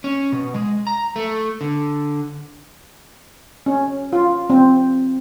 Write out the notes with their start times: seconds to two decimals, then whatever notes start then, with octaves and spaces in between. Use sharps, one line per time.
0.04 C#4
0.32 B2
0.54 G#3
0.87 A#5
1.16 A3
1.61 D3
3.66 C#4
4.13 F4
4.50 C4